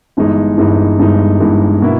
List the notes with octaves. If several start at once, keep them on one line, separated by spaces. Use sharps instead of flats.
G1 G2 E3 G#3 D#4
G1 G2 E3 G#3 D#4
G1 G2 E3 G#3 D#4
G1 G2 E3 G#3 D#4
B2 A#3 E4